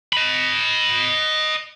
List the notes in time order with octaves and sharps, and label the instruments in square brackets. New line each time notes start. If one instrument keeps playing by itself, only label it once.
[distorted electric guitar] D#5 B5